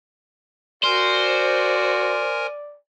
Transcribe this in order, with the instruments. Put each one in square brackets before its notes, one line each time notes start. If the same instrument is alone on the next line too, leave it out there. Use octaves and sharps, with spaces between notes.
[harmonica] F#4 [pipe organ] A#4 G#5 [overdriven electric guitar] C5 [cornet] D5